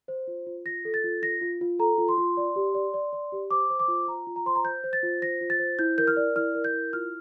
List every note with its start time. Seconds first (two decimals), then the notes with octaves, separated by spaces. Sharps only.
0.08 C5
0.28 F4
0.47 F4
0.66 F4 A#6
0.85 A4
0.94 A6
1.04 F4
1.22 F4 A#6
1.41 F4
1.61 F4
1.79 A4 A#5
1.98 F4
2.08 C6
2.18 F4
2.37 D5
2.56 G4
2.75 D5
2.94 D5
3.13 D5
3.32 G4
3.51 C5 D6
3.70 C5
3.80 D6
3.88 F4
4.08 F4 A#5
4.27 F4
4.36 A#5
4.46 C5 C6
4.55 A#5
4.64 C5 G6
4.84 C5
4.93 A6
5.03 F4
5.22 C5 A#6
5.41 F4
5.50 A6
5.59 C5
5.79 E4 G6
5.98 A#4 G6
6.08 F6
6.17 D5
6.36 E4 F6
6.55 A#4
6.64 G6
6.74 E4
6.93 F4 F6